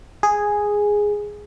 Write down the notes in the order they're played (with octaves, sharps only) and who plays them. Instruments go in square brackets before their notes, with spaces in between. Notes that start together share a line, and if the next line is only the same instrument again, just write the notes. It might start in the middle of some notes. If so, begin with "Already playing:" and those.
[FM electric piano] G#4